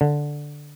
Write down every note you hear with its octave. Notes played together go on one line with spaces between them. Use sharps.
D3